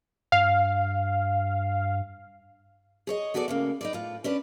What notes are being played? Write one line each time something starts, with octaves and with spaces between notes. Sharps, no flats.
G2 F5
G#4 C#5 D#5
B3 F#4 G#4 A4 D5
A2 C#3 A#3
D#4 B4 D5
A2 F4
C#4 D4 B4 D5